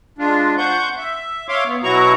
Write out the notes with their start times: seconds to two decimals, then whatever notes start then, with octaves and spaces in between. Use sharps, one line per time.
0.18 G#3 D4 F4
0.58 C5 F#5 C#6 G6
0.97 E5
1.48 C#5 E5 F5 C6 D6
1.66 B3
1.83 B2 F#3 E4 F#4 A#5 C#6